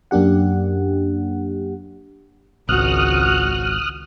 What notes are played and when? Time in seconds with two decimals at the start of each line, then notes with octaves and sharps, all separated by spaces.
0.11 F#2 A#3 D4 G4 F#5
2.69 G#1 C#2 F#4 D#6 F6 F#6